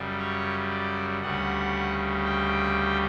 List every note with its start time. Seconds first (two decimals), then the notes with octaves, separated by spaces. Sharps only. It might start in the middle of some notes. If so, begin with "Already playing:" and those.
Already playing: F#2 C#3 G3
0.19 C#5
0.69 D5
1.22 D2 C#3 G3 F#5
2.25 G5